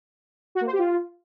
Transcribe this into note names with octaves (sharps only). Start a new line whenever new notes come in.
F#4
A#3
C5
G4
F4